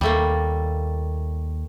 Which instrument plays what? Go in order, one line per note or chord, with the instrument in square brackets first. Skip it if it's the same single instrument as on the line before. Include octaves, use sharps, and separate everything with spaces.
[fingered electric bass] D#2 [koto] G3 A3 A#3